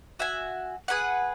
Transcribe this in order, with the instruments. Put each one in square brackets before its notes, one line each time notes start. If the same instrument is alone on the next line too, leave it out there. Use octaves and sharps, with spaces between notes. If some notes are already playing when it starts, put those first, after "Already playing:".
[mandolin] F#4 E5 G#5
G#4 B4 F#5